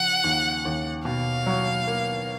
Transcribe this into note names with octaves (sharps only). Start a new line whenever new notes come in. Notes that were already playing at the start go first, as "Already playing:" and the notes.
Already playing: C#3 F3 F#5
D#2
D#2
B2 F5
F#3
A#3